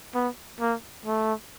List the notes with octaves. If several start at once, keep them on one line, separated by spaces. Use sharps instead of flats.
B3
A#3
A3